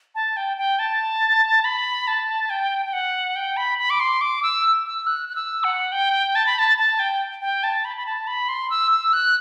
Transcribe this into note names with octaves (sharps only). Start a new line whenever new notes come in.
A5
G5
G5
A5
B5
A5
G5
G5
F#5
G5
B5
B5
D6
C6
D6
E6
E6
F#6
F#6
E6
F#5
G5
A5
B5
A5
A5
G5
G5
A5
B5
B5
A5
B5
C6
E6
E6
F#6